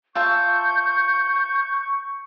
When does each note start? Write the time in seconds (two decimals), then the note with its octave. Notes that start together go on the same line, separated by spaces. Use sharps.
0.15 F4 E5 A5 C#6 G6